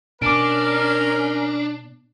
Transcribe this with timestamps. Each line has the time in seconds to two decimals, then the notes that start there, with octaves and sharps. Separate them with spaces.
0.22 B2 C#4 D4 A#4 D6 D7